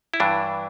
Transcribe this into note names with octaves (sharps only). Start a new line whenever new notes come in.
E4
G2 E3 D4